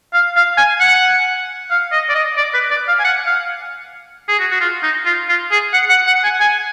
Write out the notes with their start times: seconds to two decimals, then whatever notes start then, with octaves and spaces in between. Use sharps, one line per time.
0.14 F5
0.36 F5
0.57 G#5
0.80 F#5
1.71 F5
1.92 D#5
2.09 D5
2.15 D#5
2.37 D5
2.54 B4
2.71 D5
2.88 F5
2.99 G#5
3.04 F#5
3.27 F5
4.28 G#4
4.39 F#4
4.51 F#4
4.61 F4
4.83 D#4
5.06 F4
5.29 F4
5.51 G#4
5.73 F#5
5.90 F#5
6.07 F#5
6.24 G#5
6.40 G#5